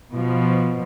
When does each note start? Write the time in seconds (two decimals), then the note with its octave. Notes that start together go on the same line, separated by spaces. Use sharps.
0.12 B2 F3